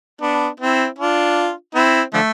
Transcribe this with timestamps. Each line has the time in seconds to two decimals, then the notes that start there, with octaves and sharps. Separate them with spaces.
0.21 B3 D4
0.60 C4 E4
0.98 D4 F4
1.75 C4 E4
2.14 D3 F3 A3